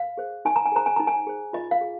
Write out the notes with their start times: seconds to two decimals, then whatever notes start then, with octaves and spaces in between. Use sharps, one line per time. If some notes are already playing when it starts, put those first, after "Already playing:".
Already playing: F5
0.17 G#4 C5
0.45 D#4 G#5
0.56 A#5
0.65 G#5
0.72 G#4 C5 A#5
0.86 G#5
0.96 D#4 A#5
1.07 G#5
1.27 G#4 C5
1.53 F4 D#5
1.71 F5
1.81 G#4